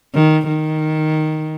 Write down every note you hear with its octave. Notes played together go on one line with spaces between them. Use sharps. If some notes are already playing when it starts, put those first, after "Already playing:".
D#3
D#3